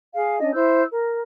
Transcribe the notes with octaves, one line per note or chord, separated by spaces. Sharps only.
G#4 F5
C#4 D4 D#5
E4 C5 E6 G6
A#4